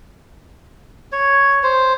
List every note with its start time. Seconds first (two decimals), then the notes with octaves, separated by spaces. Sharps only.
1.12 C#5
1.63 C5